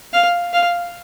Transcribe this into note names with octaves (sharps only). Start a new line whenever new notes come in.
F5
F5